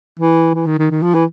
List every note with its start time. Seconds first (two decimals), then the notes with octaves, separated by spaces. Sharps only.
0.19 E3
0.55 E3
0.66 D#3
0.78 D#3
0.91 D#3
1.02 F3
1.14 E3